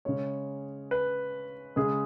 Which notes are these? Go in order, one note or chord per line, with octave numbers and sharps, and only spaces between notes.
C#3 G#3 C#5
B4
C#3 G#3 G#4